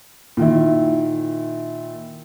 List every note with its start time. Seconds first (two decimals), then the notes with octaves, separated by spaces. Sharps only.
0.37 A#2 D#3 E4